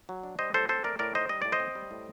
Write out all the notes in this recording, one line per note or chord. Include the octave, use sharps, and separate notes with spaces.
F#3
D4
G3 C5 D#5
A2 A4 C5
C4 A4 C5
A3 A#4 D5
A2 A#4 D5
D#4 C5 D#5
G3 D#5
A2 D5
C5 D#5
C4
G3
A2